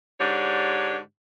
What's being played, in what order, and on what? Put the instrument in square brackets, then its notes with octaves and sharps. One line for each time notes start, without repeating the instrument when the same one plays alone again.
[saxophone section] G#2 D3 D4 G4 C#5